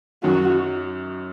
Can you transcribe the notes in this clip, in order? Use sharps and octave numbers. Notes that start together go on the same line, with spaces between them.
F#2 D#3 F#3 F#4